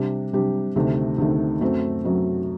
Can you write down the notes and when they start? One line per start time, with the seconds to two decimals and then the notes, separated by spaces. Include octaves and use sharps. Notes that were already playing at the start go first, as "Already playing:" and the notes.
Already playing: C3 G3 D4 G4
0.33 C3 G3 D4 G4
0.76 D2 C3 D#3 A3
1.18 D2 C3 D#3 A3
1.61 F#2 F#3 A3 C4
2.04 F#2 F#3 A3 C4